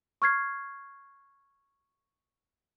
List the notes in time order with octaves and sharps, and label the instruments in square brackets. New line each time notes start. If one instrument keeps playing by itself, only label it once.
[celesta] C#6 F6 G#6 C7